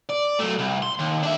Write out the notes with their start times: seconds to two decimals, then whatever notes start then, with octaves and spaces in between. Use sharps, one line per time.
0.10 D5
0.40 F#3 A3
0.59 C2
0.82 C6
0.99 D#2
1.23 D4 E5